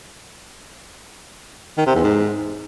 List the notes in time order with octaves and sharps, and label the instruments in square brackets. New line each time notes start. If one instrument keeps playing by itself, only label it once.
[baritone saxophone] D#3
C3
E2
G#2